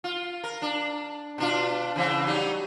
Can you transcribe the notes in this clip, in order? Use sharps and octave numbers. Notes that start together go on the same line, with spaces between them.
F4
A#4
D4
B2 D4 F4
C#3 E3 C4
F#3 G3 D#4